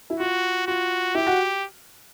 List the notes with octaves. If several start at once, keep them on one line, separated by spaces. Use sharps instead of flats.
E4
F4 F#4
F4 F#4
E4 G4
F#4